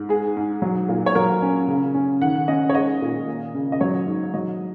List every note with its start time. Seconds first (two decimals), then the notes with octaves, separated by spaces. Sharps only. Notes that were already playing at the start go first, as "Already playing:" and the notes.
Already playing: G#2
0.09 G#3 G#4
0.37 G#2
0.62 F#3
0.88 A#2
1.06 C#5
1.15 F#3 A#4
1.42 C#4
1.68 C#3
1.94 C#4
2.21 D#3 F#5
2.48 C#4 D#5
2.69 C#5
2.75 G#3 D#5
3.02 A#2
3.27 A#3
3.54 C#3
3.72 D#5
3.81 F#3 C#5
4.07 G#2
4.34 F#3 D#5